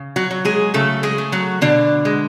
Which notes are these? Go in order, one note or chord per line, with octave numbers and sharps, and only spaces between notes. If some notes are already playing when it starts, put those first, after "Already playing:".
Already playing: C#3
F#3 F#4
F#3
G#3 G#4
C#3 A3 A4
G#3 G#4
A3
F#3 F#4
B2 D3 D4
G#3